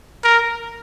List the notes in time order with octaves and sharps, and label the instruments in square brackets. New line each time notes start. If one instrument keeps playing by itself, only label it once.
[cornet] A#4